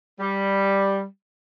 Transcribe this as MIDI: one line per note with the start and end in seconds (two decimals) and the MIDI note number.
0.19 1.04 55